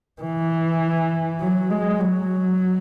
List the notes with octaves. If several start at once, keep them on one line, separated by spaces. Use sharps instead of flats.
E3
F#3
G#3
F#3